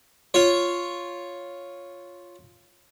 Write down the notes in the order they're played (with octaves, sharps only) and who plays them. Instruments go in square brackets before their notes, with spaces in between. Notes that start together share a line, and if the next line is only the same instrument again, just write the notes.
[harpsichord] F4 C#5